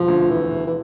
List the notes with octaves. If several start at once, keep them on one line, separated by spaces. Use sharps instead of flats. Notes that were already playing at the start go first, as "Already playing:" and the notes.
Already playing: E1 F3
D2
E1 E3
E1
E3